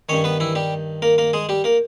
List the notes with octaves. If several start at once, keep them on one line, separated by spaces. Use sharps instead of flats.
G2 D#3 C#4 C#5
B3 B4
E3 E4
G3 G4
A#3 A#4
A#3 A#4
G#3 G#4
G3 G4
A#3 A#4